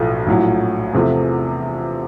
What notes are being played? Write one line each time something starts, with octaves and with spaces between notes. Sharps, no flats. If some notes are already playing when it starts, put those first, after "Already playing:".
Already playing: B1 A2 F3 A3
A#1 A2 F#3
E2 C3 F3 A3